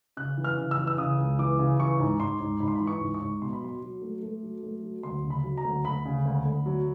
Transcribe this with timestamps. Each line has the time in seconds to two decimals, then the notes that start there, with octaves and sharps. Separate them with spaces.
0.17 C#3 F#6
0.38 E3
0.44 F6
0.58 C#3
0.71 E6
0.78 E3
0.87 E6
0.98 C#3 D#6
1.18 C#2
1.39 E3 D6
1.59 C#3
1.79 E3 C#6
2.00 G#2
2.20 G#2 C6
2.40 G#2
2.60 G#2 B5
2.68 C6
2.76 E3 B5
2.87 C#6
3.01 G#2
3.14 C#6
3.21 G#2
3.41 B2 C6
3.53 B5
3.61 F#3 C6
3.82 F#3
4.02 A3
4.22 A3
4.43 F#3
4.63 A3
4.83 F#3
5.03 D2 C6
5.24 C#3
5.30 B5
5.44 F#3
5.58 A#5
5.64 D2
5.84 D2 B5
6.05 C#3
6.25 D2
6.45 D2
6.66 F#3